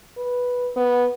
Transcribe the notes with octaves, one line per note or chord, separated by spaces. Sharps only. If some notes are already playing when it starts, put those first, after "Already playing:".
B4
B3